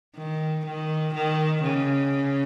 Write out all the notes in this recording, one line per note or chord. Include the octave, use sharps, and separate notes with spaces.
D#3
D#3
D#3
C#3